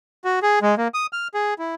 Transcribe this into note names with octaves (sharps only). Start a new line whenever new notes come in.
F#4
G#4
G#3
A#3
D#6
F6
G#4
E4